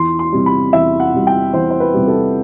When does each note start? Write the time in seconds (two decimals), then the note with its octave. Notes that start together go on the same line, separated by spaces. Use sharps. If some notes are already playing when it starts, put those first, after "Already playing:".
Already playing: E2 C6
0.19 C6
0.33 C3 G3
0.46 B5
0.73 E2 E5
1.00 F#5
1.14 C3 G3
1.27 G5
1.53 E2 C5
1.70 C5
1.80 B4
1.94 C3 G3
2.08 A4